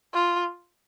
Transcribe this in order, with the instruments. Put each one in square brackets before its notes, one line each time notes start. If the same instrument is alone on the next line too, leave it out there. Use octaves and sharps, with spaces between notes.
[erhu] F4